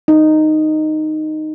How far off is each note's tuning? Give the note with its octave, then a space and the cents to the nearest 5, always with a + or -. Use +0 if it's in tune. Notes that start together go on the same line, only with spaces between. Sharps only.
D#4 -10